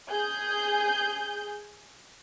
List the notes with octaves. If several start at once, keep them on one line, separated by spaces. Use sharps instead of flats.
G#4 G6